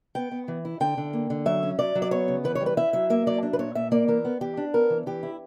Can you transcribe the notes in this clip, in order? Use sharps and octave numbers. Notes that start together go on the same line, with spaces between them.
B3 G5
B3
E3
E4
D3 G5
D3
A#3
D3
F#3 E5
C#4
F#3 D5
F#3
D5
B3 C#5
C#3
E3 B4
C#5
G3
B4
E4 E5
F#3 E5
A#3 E5
F#3 D5
D4
B4
A#2 C#5
A#2 E5
A#3 D5
E3 A#4
B3
E3 G4
D4
B3 A#4
E3
E3 G4
E4